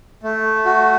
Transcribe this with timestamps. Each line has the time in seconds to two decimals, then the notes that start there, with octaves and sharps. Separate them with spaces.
0.23 A3
0.65 F#4